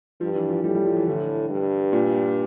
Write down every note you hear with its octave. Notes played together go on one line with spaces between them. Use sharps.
G2 F3
E3
F3
A2 G3
G3
F3
E3
A2 D3
G2
A#2